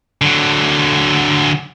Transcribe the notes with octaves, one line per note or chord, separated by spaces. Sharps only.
D3 F#3